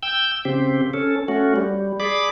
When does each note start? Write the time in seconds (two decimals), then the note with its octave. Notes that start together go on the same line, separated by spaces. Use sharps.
0.03 G5 E6 G6
0.45 C#3 C4 G4
0.94 C#4 A4
1.28 A3 C#4 F#4
1.56 G3
2.00 G#4 D5 B5 D6